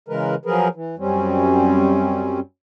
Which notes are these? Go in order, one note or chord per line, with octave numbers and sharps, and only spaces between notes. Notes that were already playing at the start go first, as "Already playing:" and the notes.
C#3 E3 G#3 A#4 B4
F3 F#3 G#4 A#4 B4
E3
F#2 G3 C4 C#4